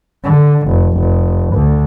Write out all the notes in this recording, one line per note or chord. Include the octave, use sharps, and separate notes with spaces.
D3
F1
F1
D2